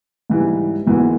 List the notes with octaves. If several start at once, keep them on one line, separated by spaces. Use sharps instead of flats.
G#2 E3 G3
G#1 G#2 E3 G#3